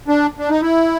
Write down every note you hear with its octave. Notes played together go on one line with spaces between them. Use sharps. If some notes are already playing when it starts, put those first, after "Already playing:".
D4
D4
D#4
E4